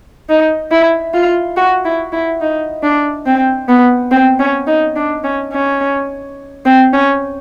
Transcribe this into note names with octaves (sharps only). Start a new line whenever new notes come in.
D#4
E4
F4
F#4
E4
E4
D#4
D4
C4
B3
C4
C#4
D#4
D4
C#4
C#4
C4
C#4